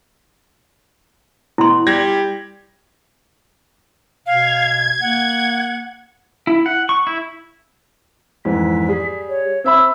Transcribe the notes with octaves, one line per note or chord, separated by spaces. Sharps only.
B2 E4 C6
G3 G#6 A#6
B2 F5 G#6
A#3 F#5
E4
F#5
C#6
E4
F2 G#2 E3 B6
G3 G#4
C#5
C4 E5 B5 E6